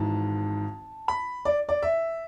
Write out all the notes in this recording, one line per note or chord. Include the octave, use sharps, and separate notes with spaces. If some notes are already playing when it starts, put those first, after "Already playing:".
Already playing: G#1 G#2 E3 A5
B5
D5
D5
E5